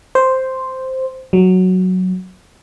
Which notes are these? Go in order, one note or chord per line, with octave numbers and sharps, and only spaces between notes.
C5
F#3